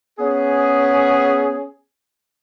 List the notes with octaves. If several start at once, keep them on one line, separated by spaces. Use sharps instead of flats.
B3 C#4 G#4